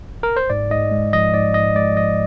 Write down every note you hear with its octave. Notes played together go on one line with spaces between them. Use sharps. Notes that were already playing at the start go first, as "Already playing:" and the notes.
A#4
C5
G#2 D5
G#2 D#5
G#3
F3 D#5
G#2 D5
G#2 D#5
G#3 D5
F3 D#5